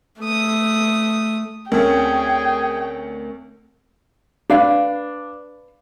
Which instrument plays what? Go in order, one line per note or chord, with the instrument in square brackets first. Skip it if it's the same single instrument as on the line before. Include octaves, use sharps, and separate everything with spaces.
[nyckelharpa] A3 D#6
[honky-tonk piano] D2 A3 C#4 [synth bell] C4 A#4 [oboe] G#4 [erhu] G5
[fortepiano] D4 [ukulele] B4 F5